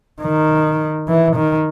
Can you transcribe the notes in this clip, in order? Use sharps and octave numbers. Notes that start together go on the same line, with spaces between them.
D#3
E3
D#3